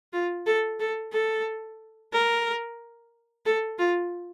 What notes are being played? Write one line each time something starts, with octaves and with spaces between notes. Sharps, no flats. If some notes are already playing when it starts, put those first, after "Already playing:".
F4
A4
A4
A4
A#4
A4
F4